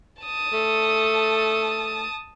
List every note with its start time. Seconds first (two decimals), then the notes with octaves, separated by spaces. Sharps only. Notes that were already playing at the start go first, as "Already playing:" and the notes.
0.22 A5 D#6
0.53 A3